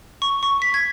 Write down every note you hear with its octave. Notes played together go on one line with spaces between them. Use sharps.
C#6
C#6
B6
G#6